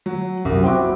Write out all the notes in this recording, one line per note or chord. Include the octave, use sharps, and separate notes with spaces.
F#3
C2 F#2
C4 E4 F#4 G5 D6